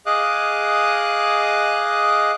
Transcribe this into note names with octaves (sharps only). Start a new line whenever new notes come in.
G#4 D#5 F5 D6 D#6 F#6